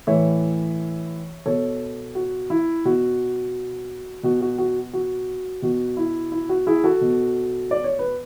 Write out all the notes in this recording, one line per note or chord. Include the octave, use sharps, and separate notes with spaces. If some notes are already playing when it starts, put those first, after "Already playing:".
A2 E3 C#5 E5
B2 A4 C#5
F#4
E4
B2 F#4
B2 F#4
F#4
F#4
F#4
B2 F#4
E4
E4
F#4
E4 G#4
F#4 A4
B2
D5
C#5
B4